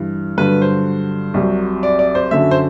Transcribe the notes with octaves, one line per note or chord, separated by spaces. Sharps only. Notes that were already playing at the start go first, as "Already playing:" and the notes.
Already playing: G2 E3
G2 D3 F#3 B4
C5
C2 C3 F#3
D5
D5
C5
F#2 D3 F#3 E5
C5